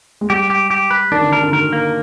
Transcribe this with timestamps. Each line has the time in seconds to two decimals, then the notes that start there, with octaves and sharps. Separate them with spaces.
0.21 G#3
0.30 G3 G4
0.50 G4
0.70 G4
0.91 B4
1.11 D#3 D4
1.21 D3
1.32 D#3 A#4
1.42 D3
1.52 D#3 A#4
1.73 A#3